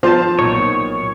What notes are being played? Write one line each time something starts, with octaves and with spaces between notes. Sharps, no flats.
F3 F4 C5 A5
B1 A#2 D#4 C#5